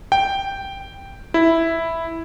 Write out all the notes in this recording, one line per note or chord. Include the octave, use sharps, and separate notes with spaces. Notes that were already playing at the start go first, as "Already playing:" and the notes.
G5
E4